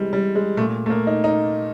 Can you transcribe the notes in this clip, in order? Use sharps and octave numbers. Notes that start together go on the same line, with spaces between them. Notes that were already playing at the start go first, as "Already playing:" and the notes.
Already playing: C3 E3 G3 G#3
G3
G#3
A#2 A3
A3
A#3
D#4
D#4